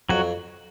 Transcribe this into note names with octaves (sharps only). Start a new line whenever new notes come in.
F2 F#3 F#4